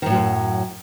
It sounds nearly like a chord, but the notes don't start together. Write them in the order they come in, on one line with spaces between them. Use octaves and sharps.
D#3 A2 F#3 F#2